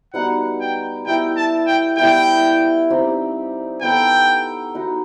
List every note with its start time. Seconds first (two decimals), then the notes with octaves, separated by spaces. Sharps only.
0.14 G3 B3 D#4 F#4 F#5
0.60 G5
1.06 B3 E4 G4 D#5 G5
1.37 A5
1.67 G5
1.98 G3 B3 E4 B4 G5
2.90 C4 D#4 G4 D#5
3.82 B3 D#4 A4 G5
4.75 D#4 F#4 B4 D#5